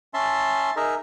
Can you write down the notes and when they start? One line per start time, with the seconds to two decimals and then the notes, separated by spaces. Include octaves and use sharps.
0.14 C#4 E5 A5 C6
0.76 D#4 G#4 A#4 D#5 E5